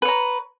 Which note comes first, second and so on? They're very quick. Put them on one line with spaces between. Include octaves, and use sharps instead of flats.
B4 C#5 A#5